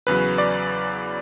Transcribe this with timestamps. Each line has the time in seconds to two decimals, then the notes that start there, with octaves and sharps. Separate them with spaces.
0.07 E2 C#3 F#3 B4
0.38 D5